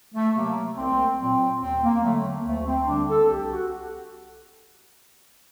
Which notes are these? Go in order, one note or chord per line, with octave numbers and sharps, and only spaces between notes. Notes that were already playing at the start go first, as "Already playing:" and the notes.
A3
C3 F#3 A#3
C2 C4
A#2 F#3 C4
D#2 C4
A#3
D3 F#3 A3
D2 A3
C4
D3 G3 D4
A4
C2 G4
F#4